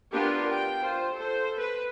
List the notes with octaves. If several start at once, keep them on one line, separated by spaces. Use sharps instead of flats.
B3 D4 F4 G4 A#4 B4
G5
F4 C5
A4 C5
B4